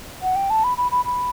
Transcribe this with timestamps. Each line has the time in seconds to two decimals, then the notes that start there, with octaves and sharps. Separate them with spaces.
0.22 F#5
0.36 G5
0.50 A5
0.64 B5
0.77 B5
0.91 B5
1.05 B5